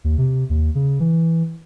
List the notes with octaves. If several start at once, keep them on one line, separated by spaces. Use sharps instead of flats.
D#2
C3
D#2
C#3
E3